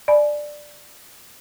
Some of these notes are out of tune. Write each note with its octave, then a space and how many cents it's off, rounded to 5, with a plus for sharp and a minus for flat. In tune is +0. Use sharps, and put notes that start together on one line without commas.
D5 +10 G#5 +40 B5 +0